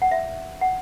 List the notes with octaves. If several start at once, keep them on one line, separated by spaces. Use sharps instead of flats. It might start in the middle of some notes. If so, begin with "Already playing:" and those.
F#5
E5
F#5